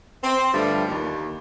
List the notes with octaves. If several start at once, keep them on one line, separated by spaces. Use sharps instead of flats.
C4
G2 D3 F3 G3 A3
D#2